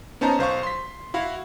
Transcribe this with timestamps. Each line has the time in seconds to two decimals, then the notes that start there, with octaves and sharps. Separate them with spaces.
0.21 B3 C#4 D#4 C5 A5 A#5
0.39 B1 C5 F5 C#6
0.63 C6 B6
1.14 E4 F#4 F5